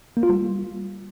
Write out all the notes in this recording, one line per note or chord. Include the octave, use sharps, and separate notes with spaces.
A#3
F4
G3